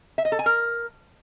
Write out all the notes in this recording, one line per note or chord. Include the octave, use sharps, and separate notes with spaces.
E5
D#5
A4
G#5
A#4